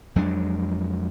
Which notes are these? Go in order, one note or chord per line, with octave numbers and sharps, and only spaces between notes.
F2 F#3 G#3 D4